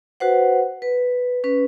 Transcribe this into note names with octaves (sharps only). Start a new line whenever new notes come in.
F#4 B4 C5 F#5
B4
C#4 B4